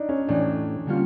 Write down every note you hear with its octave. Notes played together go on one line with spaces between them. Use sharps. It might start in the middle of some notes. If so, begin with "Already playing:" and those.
Already playing: D4 D#4
C#4
A2 E3 A3 D4
D3 G3 A#3 C#4 F4